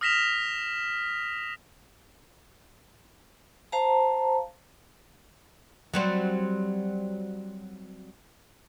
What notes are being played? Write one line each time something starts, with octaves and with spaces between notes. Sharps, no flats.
D#6 F6 A#6 B6 E7 F7
C5 F5 A5 A#5
F#3 G3 C4